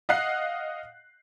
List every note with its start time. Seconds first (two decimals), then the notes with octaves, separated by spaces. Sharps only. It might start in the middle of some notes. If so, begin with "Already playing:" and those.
0.09 D#5 F5 F#5 F#6 C7